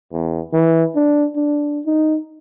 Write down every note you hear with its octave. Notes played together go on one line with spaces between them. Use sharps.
E2
E3
D4
D4
D#4